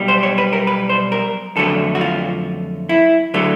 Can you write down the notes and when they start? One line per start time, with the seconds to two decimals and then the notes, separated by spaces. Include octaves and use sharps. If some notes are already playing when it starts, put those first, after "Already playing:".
Already playing: B1 B2 G3
0.08 C5
0.23 C#5
0.38 B4
0.53 A#4
0.67 B4
0.89 C5
1.12 A#4
1.56 F2 D3 F#3 A3 A4
1.95 F#4
2.01 F4
2.89 E4
3.34 D3 F#3 A3